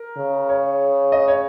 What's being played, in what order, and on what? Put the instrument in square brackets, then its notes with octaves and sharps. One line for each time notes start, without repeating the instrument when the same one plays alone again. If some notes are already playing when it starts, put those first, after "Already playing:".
Already playing: [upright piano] A#4
[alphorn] C#3
[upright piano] C#5
D#5
C#5